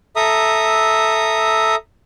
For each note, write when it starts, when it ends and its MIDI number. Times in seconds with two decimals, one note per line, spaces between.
0.16 1.75 69
0.16 1.75 76
0.16 1.75 82
0.16 1.75 87